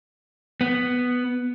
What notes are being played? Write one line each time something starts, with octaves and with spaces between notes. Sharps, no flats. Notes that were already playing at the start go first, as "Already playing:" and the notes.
B3